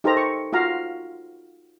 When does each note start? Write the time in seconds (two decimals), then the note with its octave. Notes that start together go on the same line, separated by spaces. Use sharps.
0.04 D#4 G4 A4 A#4 C5 A#5
0.17 C#6
0.53 F4 F#4 F5 A#5